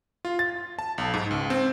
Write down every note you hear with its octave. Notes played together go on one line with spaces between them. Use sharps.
F4
A6
A5
B1
G#2
C#2
C4